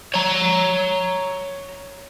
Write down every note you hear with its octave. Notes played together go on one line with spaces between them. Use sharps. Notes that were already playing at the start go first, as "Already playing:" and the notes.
C#5 A#5